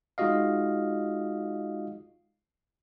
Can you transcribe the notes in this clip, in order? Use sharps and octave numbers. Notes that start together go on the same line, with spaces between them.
G#3 D#4 F4 F#4 D#5 F5